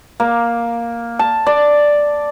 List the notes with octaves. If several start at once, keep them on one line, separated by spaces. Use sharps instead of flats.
A#3
A5
D5